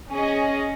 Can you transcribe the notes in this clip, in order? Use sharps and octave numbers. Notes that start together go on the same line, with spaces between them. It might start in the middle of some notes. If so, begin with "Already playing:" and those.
C#4 G#4 D#5